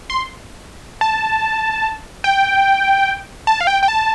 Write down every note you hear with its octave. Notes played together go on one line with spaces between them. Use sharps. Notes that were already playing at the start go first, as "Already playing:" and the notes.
C6
A5
G5
A5
F5
G5
G5
A5